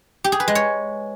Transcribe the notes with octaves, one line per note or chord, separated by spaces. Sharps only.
G4
G#4
B4
G#3
C#5